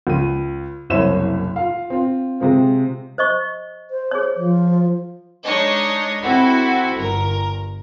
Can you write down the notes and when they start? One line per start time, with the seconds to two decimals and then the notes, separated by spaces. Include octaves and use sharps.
0.07 C#2 D#7
0.90 F#1 C2 C5 C#5 E5 E7
1.56 F4 F5
1.90 C4 F4
2.40 C3 G#3 C4 F4
3.18 C5 D#5 C#6
3.91 C5
4.11 G#4 C#5
4.37 F3
5.44 G#3 D4 D#4 C#5 D#5
6.23 C4 E4 F#4 A4
6.95 G1 A#4